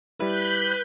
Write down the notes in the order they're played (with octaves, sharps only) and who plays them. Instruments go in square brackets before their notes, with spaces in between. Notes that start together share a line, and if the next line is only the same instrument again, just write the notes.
[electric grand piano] G3 E4 [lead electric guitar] B4 [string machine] F#6 G6 B6